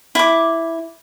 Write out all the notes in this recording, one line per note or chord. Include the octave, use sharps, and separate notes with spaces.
E4 D6